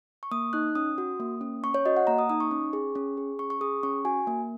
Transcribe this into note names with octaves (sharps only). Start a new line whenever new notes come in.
C#6
A#3 D#6
D#4 F#6
C#4 D#6
F#4
A#3
C#4
C#4 C#6
C#5
F#4 D#5
F#5
A#3 A#5
D#6
D#4 D#6
C#6
C#4
G#4
C#4
G#4
C#4 C#6
C#6
G#4 D#6
C#4 C#6
F#4 G#5
A#3